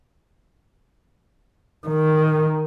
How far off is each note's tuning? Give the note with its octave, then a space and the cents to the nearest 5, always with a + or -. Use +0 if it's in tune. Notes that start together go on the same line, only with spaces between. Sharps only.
D#3 +0